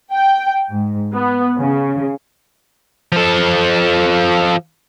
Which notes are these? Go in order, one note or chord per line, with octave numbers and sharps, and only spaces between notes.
G5
G#2
B3
C#3
F3 A4